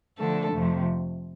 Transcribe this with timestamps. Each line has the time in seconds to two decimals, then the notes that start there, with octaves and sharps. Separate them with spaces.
0.18 D3 F3 A3 D4 A4
0.52 F2 C3 F3 A3